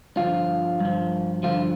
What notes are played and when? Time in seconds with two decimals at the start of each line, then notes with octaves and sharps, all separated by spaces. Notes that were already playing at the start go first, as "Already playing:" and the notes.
0.17 G2 D3 F3 F4
0.80 G2 F3
1.43 G2 D3 F3 F4